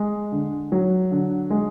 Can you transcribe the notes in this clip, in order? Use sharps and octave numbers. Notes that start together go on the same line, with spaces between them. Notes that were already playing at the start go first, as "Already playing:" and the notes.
Already playing: G#3
D3
F#3
D3
G#3